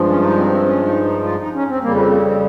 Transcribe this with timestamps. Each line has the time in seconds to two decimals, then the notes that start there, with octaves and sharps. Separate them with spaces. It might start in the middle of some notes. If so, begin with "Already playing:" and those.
Already playing: G2 F3 G#3
0.08 C#4
0.22 D#4
0.37 C4
0.51 C4
0.66 C#4
0.86 D#4
1.05 D#4
1.24 F4
1.39 D#4
1.54 C#4
1.68 C4
1.82 F2 C#3 G3 A#3
1.97 C4
2.12 C4
2.26 C4